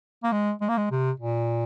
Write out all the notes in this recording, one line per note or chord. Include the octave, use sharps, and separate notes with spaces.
A#3
G#3
G#3
A#3
G#3
C3
A#2